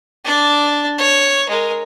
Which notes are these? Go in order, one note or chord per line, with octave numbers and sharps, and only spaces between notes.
D4 D5
C#5 C#6
G#3 A#4